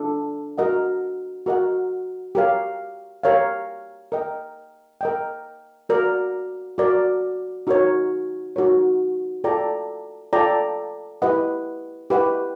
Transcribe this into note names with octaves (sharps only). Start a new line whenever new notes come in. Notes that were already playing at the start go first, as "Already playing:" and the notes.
Already playing: D4 F4 A4
F#4 A#4 D#5 F#5
F#4 A#4 D#5 F#5
G4 A#4 C#5 F5
G4 A#4 C#5 F5
A#4 D#5 G5
A#4 D#5 G5
F#4 A#4 D5
F#4 A#4 D5
D#4 F#4 A#4 C#5
D#4 F#4 A#4 C#5
F4 A4 D5 G5 A#5
F4 A4 D5 G5 A#5
E4 G4 B4 D#5 F#5
E4 G4 B4 D#5 F#5